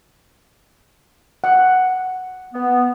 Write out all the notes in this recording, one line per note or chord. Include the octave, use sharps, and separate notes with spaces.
F#5
B3